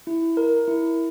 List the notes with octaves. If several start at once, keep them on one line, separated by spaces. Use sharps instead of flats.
E4
A#4
E4